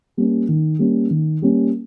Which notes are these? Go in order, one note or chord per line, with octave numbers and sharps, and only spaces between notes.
G3 A#3 C#4
D#3
G3 A#3 C#4
D#3
G3 A#3 C#4